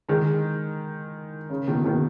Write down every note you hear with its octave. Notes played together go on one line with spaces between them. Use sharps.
D#3 G#3
C#3
B2 D#3
B2 D#3